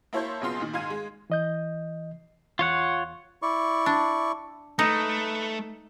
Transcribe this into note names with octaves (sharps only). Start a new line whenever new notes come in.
A#3 E4 C#5 A5 C6 G6
B1 C#3 B3 F4 C6
A#2 D#3
G#2 D#3 F5 C6 G#6 D#7
G#3
E3 D#5 G6
E2 F4 C#5 F#5
E4 D5 C#6
D4
A3 D#4 B4